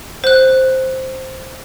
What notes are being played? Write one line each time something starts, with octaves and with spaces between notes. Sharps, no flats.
C5 F#6